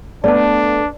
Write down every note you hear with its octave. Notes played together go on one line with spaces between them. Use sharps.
A3 B3 D4 D5 A5